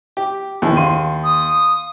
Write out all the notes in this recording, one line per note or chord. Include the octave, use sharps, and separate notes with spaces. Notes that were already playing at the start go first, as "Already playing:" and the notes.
G4
A#1 D#2 E3
F5 C6 D#7
D#6